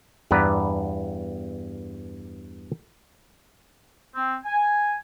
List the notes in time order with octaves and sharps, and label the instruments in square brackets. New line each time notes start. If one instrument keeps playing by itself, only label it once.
[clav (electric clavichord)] E2 G2 B3 B4 D5 A#5
[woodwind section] C4
G#5